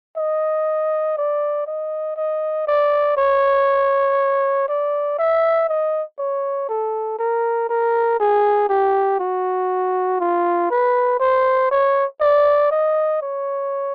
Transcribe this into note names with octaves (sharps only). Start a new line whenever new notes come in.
D#5
D5
D#5
D#5
D5
C#5
D5
E5
D#5
C#5
A4
A#4
A#4
G#4
G4
F#4
F4
B4
C5
C#5
D5
D#5
C#5